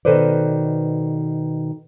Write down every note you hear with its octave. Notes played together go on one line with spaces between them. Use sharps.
B2 D#3 A4 B4 C5 D5